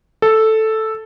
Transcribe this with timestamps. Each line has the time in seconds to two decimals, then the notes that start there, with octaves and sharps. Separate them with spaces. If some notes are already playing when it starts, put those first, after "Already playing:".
0.22 A4